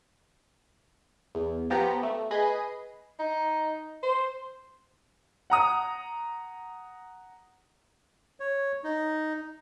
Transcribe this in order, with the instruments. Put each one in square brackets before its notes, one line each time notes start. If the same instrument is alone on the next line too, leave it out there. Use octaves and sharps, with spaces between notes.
[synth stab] E2
F3 B3 G4 A#5
A3
G#4 B4 D#5 B5
[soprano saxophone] D#4
C5
[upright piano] F#5 A#5 D#6
[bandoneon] C#5
D#4